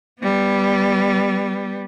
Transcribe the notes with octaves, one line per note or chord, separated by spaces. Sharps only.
G3 B3